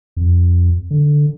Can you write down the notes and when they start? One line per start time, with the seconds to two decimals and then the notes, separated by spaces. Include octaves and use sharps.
0.17 F2
0.91 D3